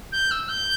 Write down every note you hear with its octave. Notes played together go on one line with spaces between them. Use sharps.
G6
E6
G6